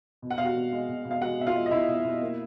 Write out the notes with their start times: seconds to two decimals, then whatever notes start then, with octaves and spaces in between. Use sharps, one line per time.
0.22 B2
0.30 F#5
0.38 B2 F5
0.45 F#4 F#5
0.56 B2
0.72 G#3
0.89 B2
1.05 B2
1.11 F5
1.22 G#3 F#4 F#5
1.38 B2 E5
1.47 F4 F5
1.55 G#3
1.66 D#5
1.71 B2 E4 E5
1.88 B2
2.04 B2
2.21 A#3